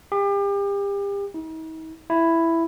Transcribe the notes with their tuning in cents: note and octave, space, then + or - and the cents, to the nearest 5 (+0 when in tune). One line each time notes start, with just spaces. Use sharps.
G4 +35
D#4 +45
E4 +5